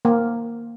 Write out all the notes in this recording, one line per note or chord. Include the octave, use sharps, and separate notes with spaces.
A#3